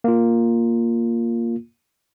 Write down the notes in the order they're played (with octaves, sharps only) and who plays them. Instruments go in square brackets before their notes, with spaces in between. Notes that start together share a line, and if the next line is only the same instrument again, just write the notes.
[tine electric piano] A#3 F4